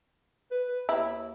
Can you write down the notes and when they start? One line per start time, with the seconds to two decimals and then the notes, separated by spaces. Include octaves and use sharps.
0.51 B4
0.68 B4
0.89 D#2 E4